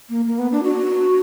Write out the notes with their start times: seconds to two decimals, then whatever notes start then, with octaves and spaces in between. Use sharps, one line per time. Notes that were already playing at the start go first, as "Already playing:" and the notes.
0.10 A#3
0.27 A#3
0.39 B3
0.52 D4
0.63 F#4